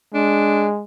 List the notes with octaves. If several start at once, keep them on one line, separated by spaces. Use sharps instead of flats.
G#3 D4